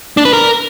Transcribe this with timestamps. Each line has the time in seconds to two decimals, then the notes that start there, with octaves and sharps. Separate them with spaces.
0.17 D4
0.25 B4
0.33 A#4